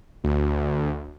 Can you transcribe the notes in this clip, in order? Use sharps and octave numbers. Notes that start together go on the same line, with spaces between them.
D2